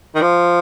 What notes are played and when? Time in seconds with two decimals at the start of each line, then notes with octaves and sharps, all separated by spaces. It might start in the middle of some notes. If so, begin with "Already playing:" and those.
0.15 D#3
0.21 F3